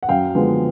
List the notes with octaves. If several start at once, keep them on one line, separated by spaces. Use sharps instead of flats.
F#5
F#2 F5 G5
D3 F3 G#3 B3